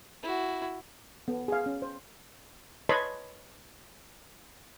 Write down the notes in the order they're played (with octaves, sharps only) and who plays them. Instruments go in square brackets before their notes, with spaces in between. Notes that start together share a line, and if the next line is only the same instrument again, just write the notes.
[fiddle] E4 F#4
[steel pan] B3 A4
G#4 F5
C#4
C5
B4 C#5 D#5 A5 B5 C6